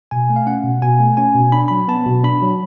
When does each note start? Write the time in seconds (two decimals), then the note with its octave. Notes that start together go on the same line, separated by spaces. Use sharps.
0.11 B2 G#5
0.30 A3
0.36 F5
0.47 C#4 F#5
0.64 B2
0.82 B2 G#5
1.00 A3
1.17 C#4 G#5
1.35 B2
1.52 D4 B5
1.68 F#3 B5
1.88 B3 A5
2.06 B2
2.24 D4 B5
2.42 F#3